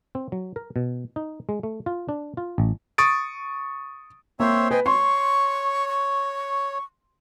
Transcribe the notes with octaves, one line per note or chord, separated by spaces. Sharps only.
C4
F#3
A#4
B2
D#4
G#3
A3
F4
D4
F4
A1
C#6 D#6 A6 D7
A#3 C4 C5 C#5 E5
B4 D#5 G5 G#5
C#5 C6 C#6
C#6